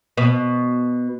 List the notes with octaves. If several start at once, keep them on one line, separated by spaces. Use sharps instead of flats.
B2